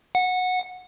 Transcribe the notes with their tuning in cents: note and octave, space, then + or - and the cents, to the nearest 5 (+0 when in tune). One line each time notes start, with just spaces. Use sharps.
F#5 -15